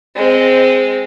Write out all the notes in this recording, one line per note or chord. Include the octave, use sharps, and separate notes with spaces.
G#3 C4